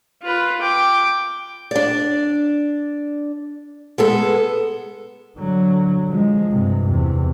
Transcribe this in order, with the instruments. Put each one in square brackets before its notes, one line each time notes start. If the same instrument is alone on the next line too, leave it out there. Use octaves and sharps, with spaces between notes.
[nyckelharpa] F4 B4
G5 D6
[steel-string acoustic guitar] D4 D5
G#3 B3 A4
[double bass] D3 F#3
F3 G#3
G2 C3
E2 C3